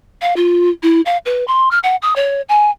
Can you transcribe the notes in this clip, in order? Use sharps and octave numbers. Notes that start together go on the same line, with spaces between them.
F5
F4
E4
F5
B4
C6
F6
F#5
D#6
C#5
G#5